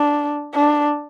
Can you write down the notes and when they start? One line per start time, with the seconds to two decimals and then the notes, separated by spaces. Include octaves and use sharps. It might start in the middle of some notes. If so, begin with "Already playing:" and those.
Already playing: D4
0.54 D4